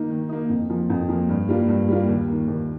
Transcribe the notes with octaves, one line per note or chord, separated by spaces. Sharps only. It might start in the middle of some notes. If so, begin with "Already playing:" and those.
Already playing: D#3 A#3 D#4
D#3
A#3 D#4
F2
F3 A#3
F2
F3 A#3
G2
G3 A#3 F4
G2
G3 A#3 F4
D#2
D#3 A#3
D#2